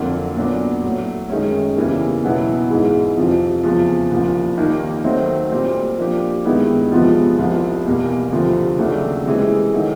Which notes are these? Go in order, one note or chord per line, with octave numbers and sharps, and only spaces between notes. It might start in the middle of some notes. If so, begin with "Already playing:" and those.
Already playing: F2 D3 F#3 A#3
A#2 F#3 B3 D4
A2 F#3 A3
F#2 D#3 G#3 C#4
E2 C#3 E3 G3 A#3
E2 B2 F#3 B3 E4
G#2 E3 G#3
F2 C3 F3
E2 C#3 F3
C2 A#2 F3
D#2 D#3 G3 A#3
D#3 F#3 A3 C4
A#2 G3 C4
F3 A#3 D4 G4
G2 D#3 G#3 B3 E4
E2 C3 F3 G#3 B3
C2 C3 F3
E2 B2 G3 A#3
D2 C3 F3
D#2 C#3 F#3 A3 D4
C3 E3 G#3
D#3 F#3 A3